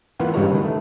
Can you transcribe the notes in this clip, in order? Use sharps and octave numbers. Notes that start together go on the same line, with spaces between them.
E3 A#3 B3 F4
G2 C#3 G3 G#3 C#5 A#5
D#3 B4
A3